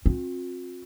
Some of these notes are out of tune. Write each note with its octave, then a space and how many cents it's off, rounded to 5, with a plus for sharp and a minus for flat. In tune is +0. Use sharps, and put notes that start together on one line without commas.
C4 +25 F4 +45